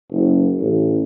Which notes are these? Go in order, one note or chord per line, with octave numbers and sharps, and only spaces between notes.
F#1
A1